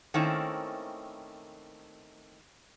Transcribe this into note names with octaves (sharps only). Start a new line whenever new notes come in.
D#3 A3 A#3 C4 C#4 E4